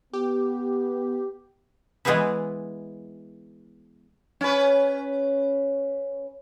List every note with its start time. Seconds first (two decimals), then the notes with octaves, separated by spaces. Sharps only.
0.13 B3 G4
2.05 E3 G#3 B3 E4 G#4 B4
4.41 C#4 B4